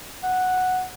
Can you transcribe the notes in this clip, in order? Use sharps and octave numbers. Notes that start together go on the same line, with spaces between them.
F#5